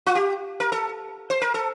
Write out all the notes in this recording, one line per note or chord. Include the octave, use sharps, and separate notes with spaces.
F4
G4
A#4
A4
C5
A#4
A4